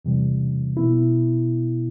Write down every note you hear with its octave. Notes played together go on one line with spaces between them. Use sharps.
E2 C3 E3 G3
B2 B3 E4